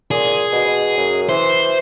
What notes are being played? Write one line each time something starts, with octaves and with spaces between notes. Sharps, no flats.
A#2 G#4
B2
B2
F#2
E3 C5